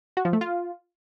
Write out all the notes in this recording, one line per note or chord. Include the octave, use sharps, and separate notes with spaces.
F#4
F3
A3
F4